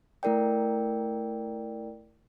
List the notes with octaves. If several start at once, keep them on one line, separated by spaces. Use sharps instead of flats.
A3 E4 A#4 D5 G5